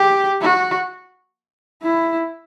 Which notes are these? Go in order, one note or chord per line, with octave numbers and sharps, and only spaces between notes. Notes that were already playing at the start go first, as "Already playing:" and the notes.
Already playing: G4
F#4
E4